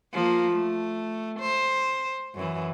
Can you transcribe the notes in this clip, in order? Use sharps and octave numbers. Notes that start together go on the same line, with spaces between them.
F3 A#3
A3
C5
F#2 E3